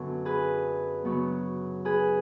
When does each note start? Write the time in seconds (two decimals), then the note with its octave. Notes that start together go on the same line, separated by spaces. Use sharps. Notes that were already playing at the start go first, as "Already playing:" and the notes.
Already playing: F#2 D3 F#3 B3
0.25 G#4 B4
1.05 C#3 F#3 B3
1.85 G#4 B4